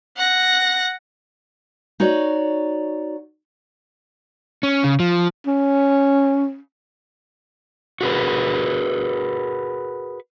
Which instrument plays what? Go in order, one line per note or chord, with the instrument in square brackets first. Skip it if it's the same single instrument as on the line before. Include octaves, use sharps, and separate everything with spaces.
[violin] F#5 A#6
[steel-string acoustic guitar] D#4 F#4 C#5 D5
[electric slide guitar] C#4
C#3
F3
[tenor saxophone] C#4
[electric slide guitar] F#4 G#4 A#4 B4